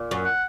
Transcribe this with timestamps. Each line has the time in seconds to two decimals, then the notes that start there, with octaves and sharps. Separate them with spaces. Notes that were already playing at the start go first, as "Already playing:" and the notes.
Already playing: A#2
0.11 F#2
0.25 F#5